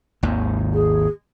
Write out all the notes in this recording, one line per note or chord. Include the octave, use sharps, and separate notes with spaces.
G#1 D#2 G#2
G#4